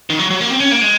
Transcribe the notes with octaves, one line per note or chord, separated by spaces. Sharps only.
D#3
F#3
F#3
A#3
C4
C#4
A#3
G#3